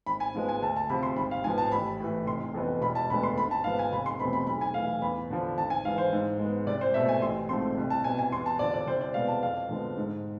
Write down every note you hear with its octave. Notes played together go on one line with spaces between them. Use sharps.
G#1 B5
G#5
G#2 F3 G#3 B3
G#5
D2 A5
A5
C3 F3 B5
C6
G#1 B5
F5
G#2 F3 B3 G#5
A5
A1 B5
A2 E3
F1 C6
F2 E3 B3
E1 B5
A5
D2 D3 G#3 B3 B5
C6
G#1 B5
A5
G#2 F3 B3 F5
G#5
F1 B5
C6
E2 B2 A3 C4 B5
B5
B1 B5
G#5
A2 E3 F5
E2 B5
D3 F3
G#1 A5
G#5
G#2 E3 F5
C5
G#2
G#3
B3
C2 D5
C5
B2 A3 E5
G#5
A1 C6
G#2 F3 A3 C4 C6
C2
A5
B2 B3 G#5
G#5
E2 C6
A5
D3 F3 D5
D5
C2 C5
D5
B2 G#3 B3 F5
A5
F2 F5
D3 F3 G#3 B3
G#2